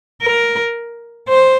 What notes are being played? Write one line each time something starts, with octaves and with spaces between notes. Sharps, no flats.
A#4
C5